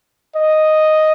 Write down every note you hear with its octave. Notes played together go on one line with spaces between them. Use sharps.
D#5